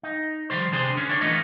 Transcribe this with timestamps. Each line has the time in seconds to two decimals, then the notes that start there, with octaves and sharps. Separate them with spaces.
0.03 D#4
0.50 D#3 F3 G3 C5
0.72 C3 D4 G#4 C5
0.95 D3 C#4
1.09 D4 C#5
1.21 E3 A3 B3 F4 D#5